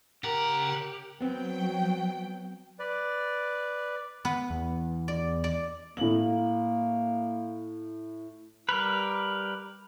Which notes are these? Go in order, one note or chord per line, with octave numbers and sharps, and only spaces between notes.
C#3 G4 A#4 F#5 A#5
F#3 B3 C4 G5
B4 D5
B3 B4
E2
D5
D5
A2 A#3 F#7
G3 A#4 B4